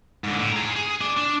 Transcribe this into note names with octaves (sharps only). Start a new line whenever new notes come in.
G#2 D3
A2
G#4 A#5
G#4
D4
D4